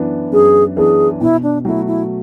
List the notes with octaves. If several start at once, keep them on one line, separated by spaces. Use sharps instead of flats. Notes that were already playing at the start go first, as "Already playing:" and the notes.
Already playing: F#2 E3 B3 D4
F#2 G#4
E3 B3 D4 G#4
B2 E4
D4
F#3 A3 E4
E4